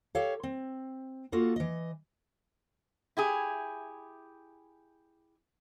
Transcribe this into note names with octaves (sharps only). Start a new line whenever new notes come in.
G4 A4 C#5 F5
C4
A#3 F4 F#4 A4
E3 D#5
E4 G4 G#4